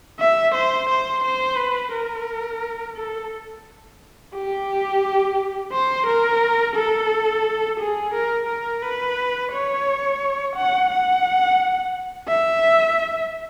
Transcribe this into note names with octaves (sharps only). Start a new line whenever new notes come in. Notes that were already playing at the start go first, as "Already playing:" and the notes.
E5
C5
C5
C5
B4
A#4
A4
G4
C5
A#4
A4
G#4
A#4
A#4
B4
C#5
F#5
F#5
E5